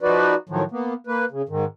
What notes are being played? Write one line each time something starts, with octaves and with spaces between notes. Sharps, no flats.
F3 D#4 F#4 B4 D5
A2 D#3 F3 F#3
A#3 B3
A#3 B4
C#3
G#2 D#3